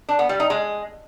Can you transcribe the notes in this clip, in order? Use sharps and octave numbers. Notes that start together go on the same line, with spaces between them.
D4
B3
G3
D#4
G#3